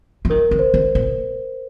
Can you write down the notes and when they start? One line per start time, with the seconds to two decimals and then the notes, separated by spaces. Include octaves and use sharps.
0.25 F3
0.30 D#3 A#4
0.51 D#3
0.59 C5
0.74 D#3
0.95 A#2